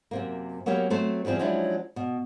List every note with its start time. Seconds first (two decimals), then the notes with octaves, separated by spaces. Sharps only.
0.11 F#2 C3 A#3
0.66 F#3 A#3 B3 C#4 G4
0.90 F#3 A3 C4 C5 A5
1.25 E2 F3 G3 C4 G#4
1.39 F3 F#3 G#3 C#4 D4 E4
1.96 B2